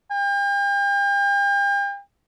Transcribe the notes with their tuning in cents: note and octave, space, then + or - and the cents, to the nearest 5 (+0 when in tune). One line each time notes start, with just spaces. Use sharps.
G5 +40